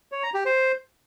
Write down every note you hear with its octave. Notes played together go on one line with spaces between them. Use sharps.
C#5
A#5
G4
C5